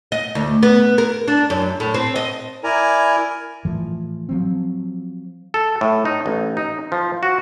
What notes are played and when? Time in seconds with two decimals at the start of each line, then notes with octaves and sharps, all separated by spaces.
0.12 D#5
0.35 D2
0.63 B3
0.98 A#4
1.28 D4
1.50 F#2
1.80 A2
1.94 C4
2.16 D#5
2.64 E4 A#4 D5 G#5 A#5
3.65 A2 E3 F3
4.29 F3 F#3 C4
5.54 A4
5.81 A2
6.05 D#4
6.26 A1
6.57 D#4
6.92 F3
7.23 F#4